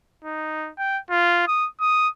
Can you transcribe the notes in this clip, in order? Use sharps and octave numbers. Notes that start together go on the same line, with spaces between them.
D#4
G5
F4
D#6
D#6